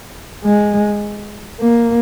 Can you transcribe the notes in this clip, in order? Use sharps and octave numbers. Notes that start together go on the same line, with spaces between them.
G#3
A#3